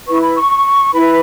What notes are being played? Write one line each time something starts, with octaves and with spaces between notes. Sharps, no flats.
E4 B4 C#6
B5
C#6
E4 B4 B5